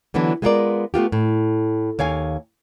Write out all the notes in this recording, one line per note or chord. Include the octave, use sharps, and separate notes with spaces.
D3 E3 F#3 B3 D4
G#3 B3 F4 G4 A#4 D5
A3 B3 F4 G4
A2
D#2 C#5 F5 G#5